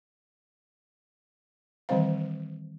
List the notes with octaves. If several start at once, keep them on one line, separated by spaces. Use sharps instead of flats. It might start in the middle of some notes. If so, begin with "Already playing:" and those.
D#3 E3 G3 C4 C5 F5